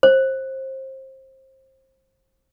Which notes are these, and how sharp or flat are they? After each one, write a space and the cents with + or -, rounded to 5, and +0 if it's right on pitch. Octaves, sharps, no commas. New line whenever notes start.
C5 +25